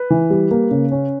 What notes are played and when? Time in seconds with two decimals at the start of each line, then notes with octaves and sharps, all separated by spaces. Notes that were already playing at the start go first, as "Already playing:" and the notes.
Already playing: B4
0.10 E3
0.30 G3
0.51 A#3
0.71 C#3
0.91 C#4